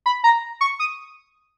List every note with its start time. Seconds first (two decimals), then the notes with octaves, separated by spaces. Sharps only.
0.06 B5
0.24 A#5
0.61 C#6
0.80 D#6